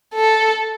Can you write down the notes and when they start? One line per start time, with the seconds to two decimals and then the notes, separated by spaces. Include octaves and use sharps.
0.14 A4